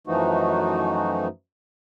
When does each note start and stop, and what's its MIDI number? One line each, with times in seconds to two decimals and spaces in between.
0.07 1.27 42
0.07 1.27 52
0.07 1.27 53
0.07 1.27 57
0.07 1.27 63
0.07 1.27 66